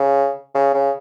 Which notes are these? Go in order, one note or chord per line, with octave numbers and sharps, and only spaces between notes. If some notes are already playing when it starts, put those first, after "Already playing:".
Already playing: C#3
C#3
C#3